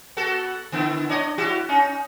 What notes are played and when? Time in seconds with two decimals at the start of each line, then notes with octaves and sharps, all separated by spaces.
0.17 B3 F#4 A4
0.72 D3 B3 E4
1.09 D4 C#5 D#5
1.38 E4 F#4 G4
1.69 C#4 D#4